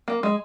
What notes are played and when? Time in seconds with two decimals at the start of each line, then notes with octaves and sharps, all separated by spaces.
0.08 A#3
0.23 G#3